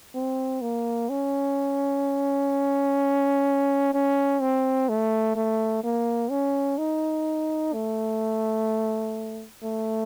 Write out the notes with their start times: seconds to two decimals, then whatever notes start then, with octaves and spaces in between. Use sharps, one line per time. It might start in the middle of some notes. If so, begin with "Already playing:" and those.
0.15 C4
0.62 A#3
1.09 C#4
3.94 C#4
4.41 C4
4.89 A3
5.36 A3
5.84 A#3
6.30 C#4
6.78 D#4
7.73 A3
9.63 A3